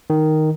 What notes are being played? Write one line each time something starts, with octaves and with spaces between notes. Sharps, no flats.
D#3